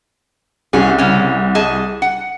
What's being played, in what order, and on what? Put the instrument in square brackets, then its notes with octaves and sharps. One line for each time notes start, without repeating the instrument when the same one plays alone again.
[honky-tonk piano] C2 [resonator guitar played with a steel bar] C#4 G#4
[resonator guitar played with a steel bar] C#3 C#4
G#4 D#5 A5
F#5